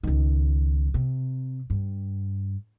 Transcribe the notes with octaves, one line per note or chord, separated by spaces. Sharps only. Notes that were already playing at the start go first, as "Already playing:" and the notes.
C#2 D#3
C3
G2